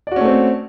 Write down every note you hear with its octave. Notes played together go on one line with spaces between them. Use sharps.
A3 C4 C#4 F#4 D5